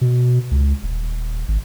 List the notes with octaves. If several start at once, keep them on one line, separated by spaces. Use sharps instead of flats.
B2
C#2
D#1
G#1